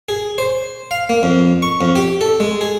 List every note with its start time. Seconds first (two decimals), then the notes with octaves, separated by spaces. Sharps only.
0.09 G#4
0.38 C5
0.91 F5
1.09 A#3
1.23 F2
1.62 C#6
1.81 F2
1.95 G4
2.21 A4
2.40 G#3
2.61 G#4